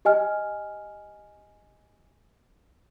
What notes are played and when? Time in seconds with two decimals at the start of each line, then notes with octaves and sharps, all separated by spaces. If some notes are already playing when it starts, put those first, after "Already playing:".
0.05 G4 D#5 G#5 F6